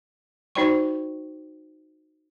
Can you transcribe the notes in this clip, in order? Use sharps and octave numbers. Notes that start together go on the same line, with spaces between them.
D#4 F#4 C5 D5 G5 C#6